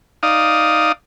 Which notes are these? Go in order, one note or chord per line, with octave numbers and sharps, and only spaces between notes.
D#4 D5 F5 D#6